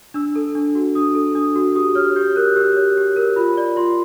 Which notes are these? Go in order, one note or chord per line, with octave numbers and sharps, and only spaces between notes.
D4 E6
A4
D4
F#4
D4 D#6
A4
D4 D#6
F#4
G4 D#6
C#5 F6
G4 G6
A#4 F#6
G4 E6
C#5
G4
A#4
F4 B5
D5
F4 C6